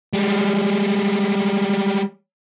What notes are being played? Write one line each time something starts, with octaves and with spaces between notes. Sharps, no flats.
G3 G#3